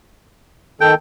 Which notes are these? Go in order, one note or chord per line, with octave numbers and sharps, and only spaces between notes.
D#3 A4 G5